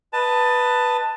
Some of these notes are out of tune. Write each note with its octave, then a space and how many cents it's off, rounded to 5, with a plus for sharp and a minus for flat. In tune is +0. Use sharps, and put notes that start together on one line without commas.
B4 +0 D#5 +0 A5 +15